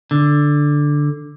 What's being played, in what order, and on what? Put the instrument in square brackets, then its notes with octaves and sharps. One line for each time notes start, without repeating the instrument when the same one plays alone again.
[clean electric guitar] D3